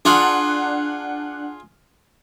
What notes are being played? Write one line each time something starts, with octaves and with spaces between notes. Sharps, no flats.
D4 F4 G#4 F#5 F#6